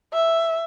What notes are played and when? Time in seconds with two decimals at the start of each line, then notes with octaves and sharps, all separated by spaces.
0.13 E5